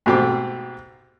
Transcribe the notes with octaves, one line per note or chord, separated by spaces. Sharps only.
G#2 B2 A3 C4 G4 D6